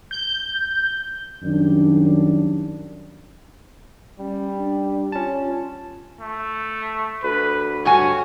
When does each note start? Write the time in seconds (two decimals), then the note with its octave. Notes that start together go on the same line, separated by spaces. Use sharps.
0.11 G6
1.43 F#2 D#3 G3 D4
4.19 G3 C#4
4.56 D4
5.12 C#4 F4 A5
6.21 A3
7.23 D2 B4
7.85 G2 F#4 C#5 G#5